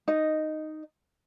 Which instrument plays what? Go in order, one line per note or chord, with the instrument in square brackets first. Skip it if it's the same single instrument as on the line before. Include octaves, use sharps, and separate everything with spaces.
[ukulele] D#4 D#5